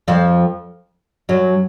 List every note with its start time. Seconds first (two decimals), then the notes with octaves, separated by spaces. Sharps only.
0.08 F2 F3
1.29 F#2 F#3